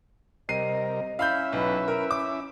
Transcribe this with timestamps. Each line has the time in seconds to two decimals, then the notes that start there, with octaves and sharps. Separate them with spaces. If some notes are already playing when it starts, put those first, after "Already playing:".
0.49 C3 G3 A#4 D#5 C7 D#7
1.19 C#4 E4 E5 F5 B5 G6
1.53 B1 B4
1.88 A#4
2.11 D6